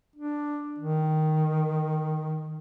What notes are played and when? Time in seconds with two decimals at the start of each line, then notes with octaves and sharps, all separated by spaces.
0.16 D4
0.78 D#3